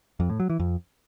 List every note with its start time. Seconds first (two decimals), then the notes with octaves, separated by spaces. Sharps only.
0.20 F2
0.30 A2
0.40 F#3
0.50 E3
0.60 F2